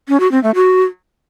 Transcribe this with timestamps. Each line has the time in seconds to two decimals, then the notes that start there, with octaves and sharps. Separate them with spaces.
0.08 C#4
0.20 F#4
0.32 C4
0.43 A3
0.55 F#4